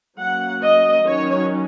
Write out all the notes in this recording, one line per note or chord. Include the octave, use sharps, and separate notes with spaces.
F#3 A#3 C#4 F#5
D#5
D#3 F#3 C#4 C#5